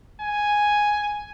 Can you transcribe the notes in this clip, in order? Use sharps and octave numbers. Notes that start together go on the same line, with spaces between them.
G#5